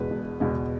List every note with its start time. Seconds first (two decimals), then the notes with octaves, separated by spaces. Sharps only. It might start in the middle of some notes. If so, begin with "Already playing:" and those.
Already playing: E1 E2 B2 G#3 B4
0.10 E1
0.40 E2 B2 G#3